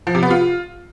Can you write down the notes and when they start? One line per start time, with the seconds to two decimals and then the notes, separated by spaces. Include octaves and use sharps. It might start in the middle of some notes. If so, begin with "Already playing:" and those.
0.07 F3
0.15 C3
0.23 B3
0.30 F4